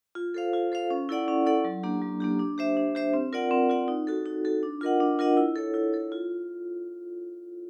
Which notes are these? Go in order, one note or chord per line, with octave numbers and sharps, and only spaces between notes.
F4
A4 C5 F5
F4
A4 C5 F5
C#4
E4 A4 D5 F#5
C#4
E4 A4 D5 F#5
F#3
A#3 D4 G4
F#3
A#3 D4 G4
D4
G4 C5 E5
D4
G4 C5 E5
C4
F4 A#4 D5 F#5
C4
F4 A#4 D5 F#5
D#4
F#4 A4
D#4
F#4 A4
D4
F4 A#4 D#5 F#5
D4
F4 A#4 D#5 F#5
E4
A4 C#5
E4
A4 C#5
F4